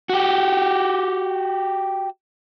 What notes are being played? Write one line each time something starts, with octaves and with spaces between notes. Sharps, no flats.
F#4 G4